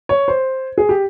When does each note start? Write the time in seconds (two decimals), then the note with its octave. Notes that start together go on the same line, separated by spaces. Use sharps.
0.09 C#5
0.28 C5
0.78 G#4
0.89 G4